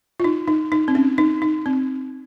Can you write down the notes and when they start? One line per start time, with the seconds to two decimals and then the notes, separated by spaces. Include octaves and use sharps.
0.20 F4
0.24 D#4
0.47 D#4
0.72 D#4
0.88 C4
0.95 C#4
1.18 D#4
1.42 D#4
1.66 C4